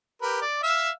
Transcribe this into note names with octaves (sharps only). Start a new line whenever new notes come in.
G4 A#4 B4
D5
E5 F5 E6